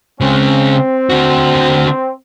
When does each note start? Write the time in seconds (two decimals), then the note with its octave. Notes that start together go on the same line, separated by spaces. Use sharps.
0.21 C#3 G#3 C4
1.10 D3 F#4